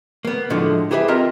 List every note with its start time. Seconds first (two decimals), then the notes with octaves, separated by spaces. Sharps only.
0.25 A#3 B3
0.50 A2 D3 F3 F#3 G#3 A3
0.91 E4 G4 G#4 B4 C#5 E5
1.08 C4 F4 A#4 D#5 E5 A#5